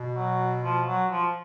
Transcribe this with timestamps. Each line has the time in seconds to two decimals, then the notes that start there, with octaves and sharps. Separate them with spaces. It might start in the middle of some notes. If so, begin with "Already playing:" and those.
Already playing: B2
0.16 F#3
0.64 F3
0.87 F#3
1.11 F3